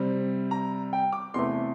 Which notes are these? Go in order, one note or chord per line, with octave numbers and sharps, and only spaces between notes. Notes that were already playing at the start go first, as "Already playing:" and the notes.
Already playing: C3 G3 C4
A#5
G5
D6
E2 C3 E3 A3 C6